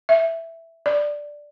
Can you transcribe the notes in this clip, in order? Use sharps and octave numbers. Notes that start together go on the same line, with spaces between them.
E5
D5